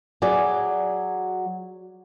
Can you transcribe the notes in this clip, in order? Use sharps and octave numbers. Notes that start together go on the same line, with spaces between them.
F#3 F#4 G#4 D5